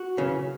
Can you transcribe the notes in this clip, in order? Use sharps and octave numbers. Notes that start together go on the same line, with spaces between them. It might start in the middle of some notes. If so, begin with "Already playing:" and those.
Already playing: F#4
F#2 C#3 E3